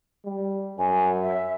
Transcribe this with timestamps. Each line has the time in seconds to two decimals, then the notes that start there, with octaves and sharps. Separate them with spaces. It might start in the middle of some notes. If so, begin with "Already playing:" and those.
0.25 G3
0.78 F#2 G#5
1.22 E5